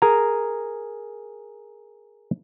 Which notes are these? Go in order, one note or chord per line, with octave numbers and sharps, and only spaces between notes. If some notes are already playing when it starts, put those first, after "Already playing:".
G#4 A#4 G#5 A#5